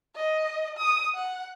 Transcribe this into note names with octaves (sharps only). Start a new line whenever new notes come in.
D#5
D#6
F#5